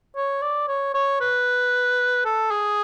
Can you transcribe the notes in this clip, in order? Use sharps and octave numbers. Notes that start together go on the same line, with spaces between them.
C#5
D5
C#5
C#5
B4
A4
G#4